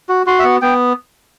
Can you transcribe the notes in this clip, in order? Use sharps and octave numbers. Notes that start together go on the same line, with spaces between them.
F#4
F#4 C6
E5
B3 F#5
B3 G5